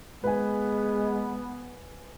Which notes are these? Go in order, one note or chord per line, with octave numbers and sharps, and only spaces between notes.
G#3 B3 B4 G#5